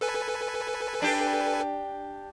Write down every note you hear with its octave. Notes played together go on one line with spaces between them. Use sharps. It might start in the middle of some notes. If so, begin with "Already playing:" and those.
A4 B4 G#5
D4 G4